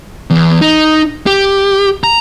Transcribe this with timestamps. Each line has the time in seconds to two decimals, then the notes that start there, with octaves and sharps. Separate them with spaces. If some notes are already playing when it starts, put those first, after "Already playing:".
0.30 E2
0.61 D#4
1.26 G4
2.04 A#5